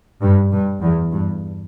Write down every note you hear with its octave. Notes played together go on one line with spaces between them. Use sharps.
G2
G2
E2
G2